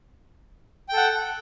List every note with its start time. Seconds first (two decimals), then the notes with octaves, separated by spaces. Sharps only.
0.89 G5
0.93 A4
0.97 F#5